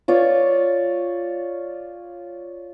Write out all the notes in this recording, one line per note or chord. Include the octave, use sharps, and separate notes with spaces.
F4 C#5 D5